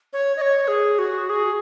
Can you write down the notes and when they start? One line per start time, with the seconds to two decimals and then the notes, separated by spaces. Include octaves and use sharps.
0.13 C#5
0.37 D#5
0.42 C#5
0.68 G#4
0.99 F#4
1.30 G#4